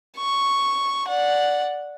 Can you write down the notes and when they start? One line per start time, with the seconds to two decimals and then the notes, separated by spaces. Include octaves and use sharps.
0.17 C#6
1.08 D5 F#5